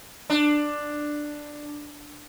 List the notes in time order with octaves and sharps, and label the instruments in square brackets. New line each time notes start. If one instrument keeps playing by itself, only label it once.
[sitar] D4